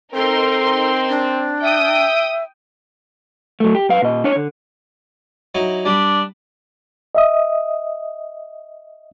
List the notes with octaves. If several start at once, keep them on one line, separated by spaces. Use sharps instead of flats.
C4 D#4 A4 A#4 C6
D4
E5 G5 D#6
F#3 A3
G4
F#2 B4 F5
A#2 D#5
D4 C#5
D3
F#3 D#4 E4
G3 D4 B5
D#5 E5 D#6